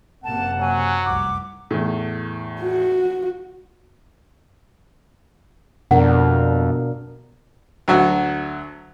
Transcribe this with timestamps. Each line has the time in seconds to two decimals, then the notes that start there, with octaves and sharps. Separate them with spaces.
0.24 F#1 C3 A#3 F#5 A5
0.60 F#3 G#5
1.05 F1 C2 D6
1.71 E2 A2
2.61 F#4
5.91 F2 B2 D4 A#4 F#5
7.88 D2 F#3 F#4